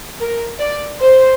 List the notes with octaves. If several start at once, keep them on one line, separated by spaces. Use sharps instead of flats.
A#4
D5
C5